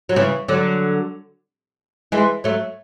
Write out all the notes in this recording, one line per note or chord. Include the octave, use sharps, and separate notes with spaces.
F#3
C#3 E3
D3 F#3
E3 G#3
F#3 A3